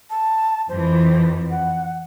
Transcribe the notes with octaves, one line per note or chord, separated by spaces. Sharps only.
A5
F2 E3 C5
F#5